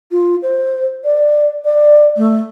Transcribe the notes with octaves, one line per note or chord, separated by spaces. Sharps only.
F4
C5
D5
D5
A3